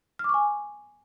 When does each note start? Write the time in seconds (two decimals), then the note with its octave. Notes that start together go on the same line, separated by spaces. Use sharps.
0.19 F6
0.24 D6
0.29 C#6
0.34 G#5